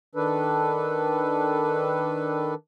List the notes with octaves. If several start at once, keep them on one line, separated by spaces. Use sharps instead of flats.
D#3 D4 A4 B4